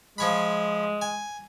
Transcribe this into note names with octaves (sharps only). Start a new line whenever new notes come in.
F3 G#3 C#5 B5
G#5